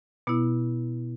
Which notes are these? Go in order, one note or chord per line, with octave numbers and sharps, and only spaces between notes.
B2 B3 E4